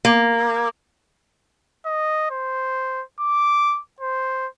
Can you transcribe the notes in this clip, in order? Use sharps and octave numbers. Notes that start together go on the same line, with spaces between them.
A#3
D#5
C5
D6
C5